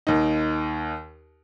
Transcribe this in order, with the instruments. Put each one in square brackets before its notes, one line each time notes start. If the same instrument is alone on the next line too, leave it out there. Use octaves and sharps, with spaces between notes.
[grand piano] D#2 D#4